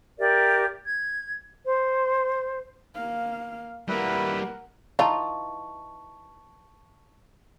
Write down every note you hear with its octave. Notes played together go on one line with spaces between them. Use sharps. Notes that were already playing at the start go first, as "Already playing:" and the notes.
G4 A#4 D5 E5
G#6
C5
A#3 F5
G3 A#3 E4 A#4 B4 F#5
E3 D#4 F4 A5 C#6